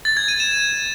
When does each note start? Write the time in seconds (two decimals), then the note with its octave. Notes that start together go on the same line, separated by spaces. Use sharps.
0.05 A6
0.17 G#6
0.28 D#7
0.40 E7